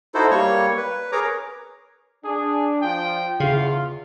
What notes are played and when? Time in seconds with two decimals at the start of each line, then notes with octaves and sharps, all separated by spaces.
0.14 D#4 E4 F#4 A4 C5
0.31 G3 A#3 C#5 C#6
0.77 B4
1.12 G#4 A#4 C#5 A#5 D6
2.24 D4 G#4
2.81 F3 F4 G5
3.40 E2 C#3 F4